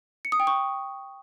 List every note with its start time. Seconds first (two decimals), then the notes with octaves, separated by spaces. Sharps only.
0.25 C#7
0.32 D#6
0.40 G5
0.47 C#6